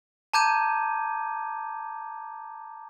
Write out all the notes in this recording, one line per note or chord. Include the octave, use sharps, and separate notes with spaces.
A5 A#5 D6 G6 G#6 D#7